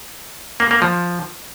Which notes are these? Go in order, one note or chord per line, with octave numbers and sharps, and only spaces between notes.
A#3
A#3
F3